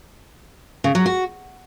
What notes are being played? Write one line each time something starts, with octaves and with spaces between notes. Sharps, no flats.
C#3
F#3
F#4